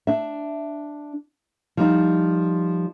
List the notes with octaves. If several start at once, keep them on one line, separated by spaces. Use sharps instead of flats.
D4 E5
F3 G3 D#4